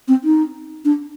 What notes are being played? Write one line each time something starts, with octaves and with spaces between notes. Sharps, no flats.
C4
D#4
D4